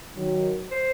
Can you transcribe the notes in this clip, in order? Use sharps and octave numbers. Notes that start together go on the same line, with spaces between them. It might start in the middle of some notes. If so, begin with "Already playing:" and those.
D#3 F#3
C5